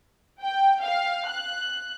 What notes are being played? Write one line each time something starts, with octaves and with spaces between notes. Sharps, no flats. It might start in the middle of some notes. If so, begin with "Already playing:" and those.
G5
F5
F#6